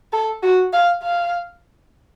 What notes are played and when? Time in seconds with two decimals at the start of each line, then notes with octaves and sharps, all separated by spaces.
0.13 A4
0.43 F#4
0.73 F5
1.03 F5